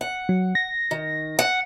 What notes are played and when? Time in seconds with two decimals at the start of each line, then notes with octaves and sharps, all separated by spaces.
0.01 F#5
0.29 F#3
0.55 A#6
0.91 D#3
1.39 F#5